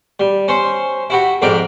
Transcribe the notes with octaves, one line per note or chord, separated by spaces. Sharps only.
G3
C#4 C5
E4 F#4 G4
F2 G#2 A#4 D5 G5